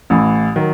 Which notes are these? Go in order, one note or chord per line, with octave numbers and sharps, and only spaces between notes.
A1 A2 E3
D#3 F#3